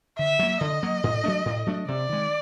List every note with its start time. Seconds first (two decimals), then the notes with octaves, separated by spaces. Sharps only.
0.19 D3 E5
0.39 F#3 A#3
0.61 D3 D#5
0.83 F#3 A#3
1.04 A2
1.24 F#3 A3 D4
1.45 A2
1.66 F#3 A3 D4
1.88 C3 D5
2.09 D#3 G#3